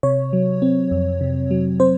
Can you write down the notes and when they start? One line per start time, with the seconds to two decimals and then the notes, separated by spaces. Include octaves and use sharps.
0.03 C3 C#5
0.33 F#3
0.62 C4
0.91 F2
1.21 C3
1.51 F#3
1.80 C4 C5